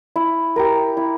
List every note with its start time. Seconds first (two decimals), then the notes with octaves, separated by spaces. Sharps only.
0.16 E4
0.56 G4 A#4
0.97 E4